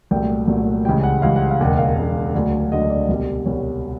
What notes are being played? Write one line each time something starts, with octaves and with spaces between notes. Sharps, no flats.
C2 A#2 F#3 A3 G5
C2 A#2 F#3 A3
C#2 C#3 E3 G3 G5
F#5
C#2 C#3 E3 G3 F5
F#5
F5
E1 D#2 C#3 F#5
F5
E1 D#2 C#3
D2 D3 F#3
D2 D3 F#3 D#5
D5
C2 B2 G3
C2 B2 G3 C#5